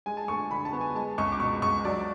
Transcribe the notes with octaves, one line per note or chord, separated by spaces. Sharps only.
G#3 G#5
A5
D2 C#6
D3 B5
A5
B3
G#5
G#3 A5
C#2 C#6
D6
B2 C#6
C#2 C#6
F#3 D5